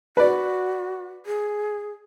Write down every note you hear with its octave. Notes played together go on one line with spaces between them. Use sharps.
F#4 B4 D5
G#4